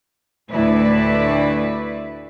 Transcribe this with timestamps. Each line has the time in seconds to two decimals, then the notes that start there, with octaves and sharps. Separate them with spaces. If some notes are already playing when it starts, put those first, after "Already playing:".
0.50 D2 A2 E4 B4 D5